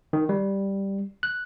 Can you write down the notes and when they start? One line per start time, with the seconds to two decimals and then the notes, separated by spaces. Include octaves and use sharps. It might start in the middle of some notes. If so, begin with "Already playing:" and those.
0.13 D#3
0.29 G3
1.23 F#6